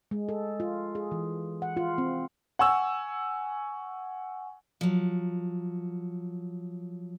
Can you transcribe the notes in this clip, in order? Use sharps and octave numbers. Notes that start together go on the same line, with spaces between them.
G#3
A4
F4
G#4
E3
F#5
F4
C4
F#5 G#5 C#6 E6
F3 F#3